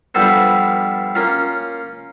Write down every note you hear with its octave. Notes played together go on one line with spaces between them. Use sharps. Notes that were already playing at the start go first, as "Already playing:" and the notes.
G2 F3 G3 B3 A4 C5
A#3 C#4 F4 F5